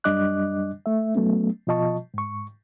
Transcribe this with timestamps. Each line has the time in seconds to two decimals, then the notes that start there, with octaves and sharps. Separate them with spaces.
0.04 F#2 G3 D4 D#5 D6 F#6
0.86 A3 E5
1.15 F#3 A3 B3 C#4
1.67 B2 F3 F4 D#5 A5 C#6
2.14 G#2 C#6